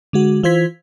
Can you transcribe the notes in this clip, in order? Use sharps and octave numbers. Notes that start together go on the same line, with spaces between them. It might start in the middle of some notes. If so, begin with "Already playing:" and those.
D3 G#3 F#4
E3 F4 C5 G#6 B6